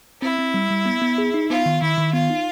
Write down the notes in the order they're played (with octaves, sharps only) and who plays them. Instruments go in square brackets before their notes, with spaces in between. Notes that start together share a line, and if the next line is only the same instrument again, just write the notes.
[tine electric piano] C4 [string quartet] E4
[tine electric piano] C4
G3
G3
B3
B3
G#4
D#4
[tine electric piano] B3 [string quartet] F4
[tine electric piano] D#3
[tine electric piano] D#3 [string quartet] E4
[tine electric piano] D#3
[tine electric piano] B3 [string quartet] F4
[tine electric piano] D#4